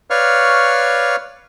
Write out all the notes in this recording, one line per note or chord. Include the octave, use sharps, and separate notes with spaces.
B4 C#5 D5 F5 C#6 F6